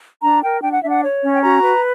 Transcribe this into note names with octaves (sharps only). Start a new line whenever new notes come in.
D4 A#5
A#4 G5
D4 G5
F#5
D4 E5
F#5
C#5
C#4
G5
F#4 A#5
B4